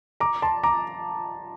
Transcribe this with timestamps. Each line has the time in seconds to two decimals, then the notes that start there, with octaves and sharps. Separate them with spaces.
0.20 A#5 D6
0.42 A5 C6
0.63 A#5 D6